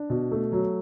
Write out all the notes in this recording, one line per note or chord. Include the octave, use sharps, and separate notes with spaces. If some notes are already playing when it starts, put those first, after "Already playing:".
Already playing: D4
B2
A3
F#3